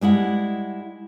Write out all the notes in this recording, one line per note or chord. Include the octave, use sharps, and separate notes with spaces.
G3 G#3 E4 F#5